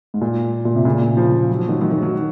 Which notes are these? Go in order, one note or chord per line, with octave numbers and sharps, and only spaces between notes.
G#2
A#2
A#2
C3
A#2 C#3
A#2
C#3 F3
F#3
F3
D#3 F#3
D#3 F#3
D#3 F#3
D#3 F#3